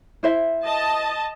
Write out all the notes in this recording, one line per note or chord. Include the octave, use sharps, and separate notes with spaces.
E4 C5 E5
D#5 A5